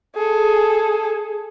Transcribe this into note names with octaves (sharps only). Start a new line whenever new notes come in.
G#4 A4